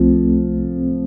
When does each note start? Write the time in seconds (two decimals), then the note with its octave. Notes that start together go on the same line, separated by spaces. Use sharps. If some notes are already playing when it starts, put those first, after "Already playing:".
Already playing: C2 F3 A3 C4